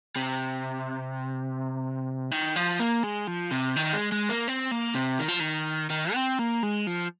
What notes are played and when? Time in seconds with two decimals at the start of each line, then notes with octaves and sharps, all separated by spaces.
0.16 C3
2.31 D#3
2.56 F3
2.80 A#3
3.04 G#3
3.27 F3
3.51 C3
3.76 D#3
3.93 G#3
4.12 G#3
4.29 A#3
4.48 C4
4.71 A#3
4.95 C3
5.19 D#3
5.29 F3
5.40 D#3
5.91 D#3
6.14 C4
6.39 A#3
6.63 G#3
6.87 F3